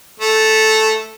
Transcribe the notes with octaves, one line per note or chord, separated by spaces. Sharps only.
A3